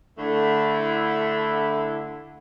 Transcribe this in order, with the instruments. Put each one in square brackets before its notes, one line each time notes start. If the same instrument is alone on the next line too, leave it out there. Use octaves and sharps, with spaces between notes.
[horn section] D3 A3 E4